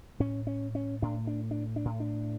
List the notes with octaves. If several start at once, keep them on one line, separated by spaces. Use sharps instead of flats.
A2 C#4
C#4
C#4
A2 D4
D4
D4
D4
A2
D4